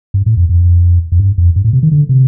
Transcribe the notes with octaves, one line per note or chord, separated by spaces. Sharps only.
G2
A2
F2
F2
F2
G2
F2
G2
A2
C3
D#3
D3
C3